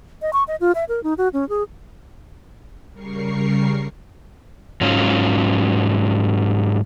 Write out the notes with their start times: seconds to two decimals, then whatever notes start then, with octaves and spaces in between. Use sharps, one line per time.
0.22 D#5
0.33 C#6
0.48 D#5
0.61 F4
0.75 E5
0.89 A#4
1.04 D#4
1.18 F#4
1.33 C#4
1.49 G#4
2.92 C#3 G3 A#4 C#6 C7
4.81 G#2 F#3 C#4 F4